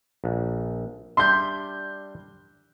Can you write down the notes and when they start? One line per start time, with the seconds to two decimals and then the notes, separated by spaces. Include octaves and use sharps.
0.24 A#1
1.17 G3 D4 E5 C6 G6